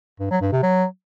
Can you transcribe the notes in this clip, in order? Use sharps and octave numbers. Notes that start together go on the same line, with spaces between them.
G2
F#3
G2
C3
F#3